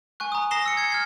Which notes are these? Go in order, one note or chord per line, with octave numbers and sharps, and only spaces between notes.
G#5 C#6 F#6
A#5 D#6
A#5 D#6 A#6 C7 E7 G7
E6 C#7
G#6 C#7
F6 G#6 C7